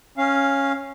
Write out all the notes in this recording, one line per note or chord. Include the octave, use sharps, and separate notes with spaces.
C#4 F5